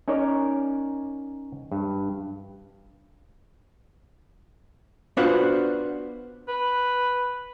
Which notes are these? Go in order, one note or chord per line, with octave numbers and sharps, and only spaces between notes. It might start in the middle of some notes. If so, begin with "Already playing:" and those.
C#4 D#4 A#4 C#5 D5
G2
B3 D4 F4 F#4 B4 C5
B4